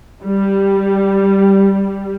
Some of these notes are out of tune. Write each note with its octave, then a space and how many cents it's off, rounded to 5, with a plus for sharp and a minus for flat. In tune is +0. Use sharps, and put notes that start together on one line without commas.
G3 +0